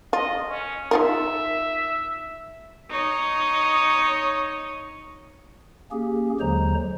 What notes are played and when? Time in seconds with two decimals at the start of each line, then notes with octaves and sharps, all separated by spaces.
0.13 F4 D#5
0.46 C#4
0.91 D#4 F4 A#4 E5
2.90 D#4 C#5
5.91 A#3 C#4 G4 G#4
6.40 D#2 D3 F#3 G#3 C5 A#5